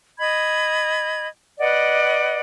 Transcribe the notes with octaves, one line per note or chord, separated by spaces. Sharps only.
D#5 B5 G#6
B4 D5 D#5 F#5